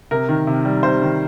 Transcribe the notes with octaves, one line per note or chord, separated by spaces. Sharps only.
C3 A#4
D#3
C3
G3
C3 C5
D#3